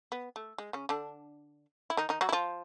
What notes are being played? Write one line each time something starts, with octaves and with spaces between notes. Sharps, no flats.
B3
A3
G#3
C#3 C#4
D3 D4
E4
D#3 D#4
D#3 D#4
F#3 F#4
E4
F3 F4